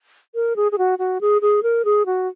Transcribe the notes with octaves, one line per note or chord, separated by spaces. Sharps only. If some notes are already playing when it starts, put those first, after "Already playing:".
A#4
G#4
G#4
F#4
F#4
G#4
G#4
A#4
G#4
F#4